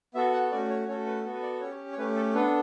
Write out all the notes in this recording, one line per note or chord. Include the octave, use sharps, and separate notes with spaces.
B3 F#4 A4 E5
F#5
A3 C#4 F#4 D5
C#5
A3 C#4 F#4 A4 C#5
B4
B3 F#4 A4
B4
D5
C#4 G4 C#5
C#5
A3 C#4 G4 B4
A4
B3 D4 A4 B4